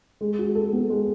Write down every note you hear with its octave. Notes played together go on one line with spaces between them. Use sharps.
G#3
F#4
A4
B3
G#3